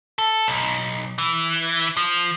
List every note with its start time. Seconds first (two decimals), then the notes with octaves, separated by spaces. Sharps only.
0.19 A4
0.48 B1
1.18 E3
1.97 F3